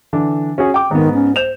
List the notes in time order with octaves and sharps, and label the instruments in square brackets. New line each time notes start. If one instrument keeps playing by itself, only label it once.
[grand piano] D3 E3 D4
C#4 F#4 G#4
G5 D6
[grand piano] G#2 B3 [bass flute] D#3
[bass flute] C#4
[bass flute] C5 [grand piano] G6 E7 F7